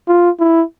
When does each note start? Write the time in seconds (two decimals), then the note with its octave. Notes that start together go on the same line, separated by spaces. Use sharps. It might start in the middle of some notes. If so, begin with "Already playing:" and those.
0.08 F4
0.40 E4